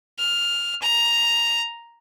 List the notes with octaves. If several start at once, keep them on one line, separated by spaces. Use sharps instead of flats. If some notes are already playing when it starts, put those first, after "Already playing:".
F6
A#5